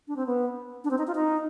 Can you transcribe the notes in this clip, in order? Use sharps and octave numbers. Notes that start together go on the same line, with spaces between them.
D4
C4
B3
D4
C4
D#4
F4
D#4